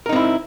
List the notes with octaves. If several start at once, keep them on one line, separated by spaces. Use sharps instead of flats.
C4 D#4 E4 A#4